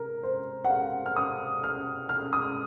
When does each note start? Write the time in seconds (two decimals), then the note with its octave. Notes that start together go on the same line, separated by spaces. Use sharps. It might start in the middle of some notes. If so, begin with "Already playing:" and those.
Already playing: C3 A#4
0.23 C5
0.65 F#5
0.70 F5
1.06 F6
1.16 D#6
1.64 F6
2.09 F6
2.33 D#6